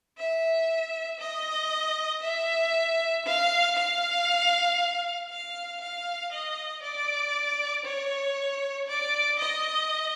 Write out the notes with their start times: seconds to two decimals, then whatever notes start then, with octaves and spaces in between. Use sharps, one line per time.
0.18 E5
1.20 D#5
2.22 E5
3.25 F5
3.76 F5
5.29 F5
5.81 F5
6.32 D#5
6.83 D5
7.85 C#5
8.88 D5
9.39 D#5